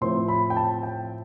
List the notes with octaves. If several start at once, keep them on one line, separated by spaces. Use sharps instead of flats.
A2 F3 C4 E4 C6
B5
G5
A5
G5